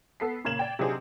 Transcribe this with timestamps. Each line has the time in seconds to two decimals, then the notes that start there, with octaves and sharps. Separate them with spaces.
0.20 B3 A4 B4 B6 C7
0.44 A#2 C#3 A#3 G#6 E7 F#7
0.59 D5 G5
0.79 C3 F#3 D4 D#4 G#4 C5